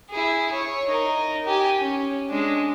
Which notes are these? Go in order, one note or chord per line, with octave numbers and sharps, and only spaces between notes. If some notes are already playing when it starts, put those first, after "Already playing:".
E4 G#4
C#5
D#4 A#4
G4 G#5
C#4
G#3 D4